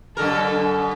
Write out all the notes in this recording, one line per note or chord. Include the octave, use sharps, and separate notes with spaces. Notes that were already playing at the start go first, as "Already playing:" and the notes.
F#2 D3 A4 A#4